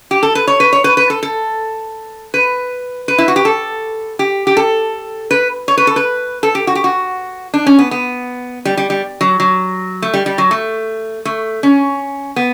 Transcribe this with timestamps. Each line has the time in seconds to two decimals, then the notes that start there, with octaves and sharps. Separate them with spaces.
0.11 G4
0.23 A4
0.35 B4
0.47 C#5
0.60 B4
0.73 C#5
0.84 B4
0.97 B4
1.10 A4
1.23 A4
2.34 B4
3.08 B4
3.18 E4
3.28 F#4
3.36 G4
3.45 A4
4.19 G4
4.47 G4
4.57 A4
5.31 B4
5.68 C#5
5.77 B4
5.87 A4
5.96 B4
6.43 A4
6.55 G4
6.67 F#4
6.75 G4
6.84 F#4
7.54 D4
7.66 C#4
7.79 B3
7.91 B3
8.65 G3
8.77 G3
8.90 G3
9.21 F#3
9.40 F#3
10.02 A3
10.14 G3
10.26 G3
10.38 F#3
10.51 A3
11.25 A3
11.63 C#4
12.36 B3